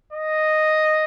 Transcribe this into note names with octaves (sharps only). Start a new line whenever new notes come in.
D#5